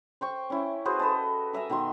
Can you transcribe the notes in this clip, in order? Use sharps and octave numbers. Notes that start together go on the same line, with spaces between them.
C5 G5 C#6
C#4 E4
F#4 G#4 B4 C5
A4 B4 D#5 A5
A#4 E5 G#5 A#5
B2 D#3 E5 C6